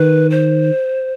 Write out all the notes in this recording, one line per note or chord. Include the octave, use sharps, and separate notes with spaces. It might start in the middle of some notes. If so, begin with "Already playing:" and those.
Already playing: D#3 B4
C5